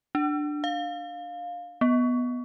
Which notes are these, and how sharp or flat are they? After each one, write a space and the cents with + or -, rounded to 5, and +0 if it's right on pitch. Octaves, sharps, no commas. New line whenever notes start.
D4 +10
F5 +15
B3 -5